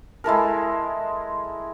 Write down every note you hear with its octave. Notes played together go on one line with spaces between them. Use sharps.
G#3 E4 A4 A#4